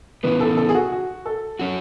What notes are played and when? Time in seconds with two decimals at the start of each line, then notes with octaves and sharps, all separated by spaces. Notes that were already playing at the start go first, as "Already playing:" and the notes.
0.23 C#3 E3 B3 B4
0.40 A4
0.57 A4
0.69 G#4
0.75 F#4
0.92 F#4
1.26 A4
1.59 F#3 C#4 F#4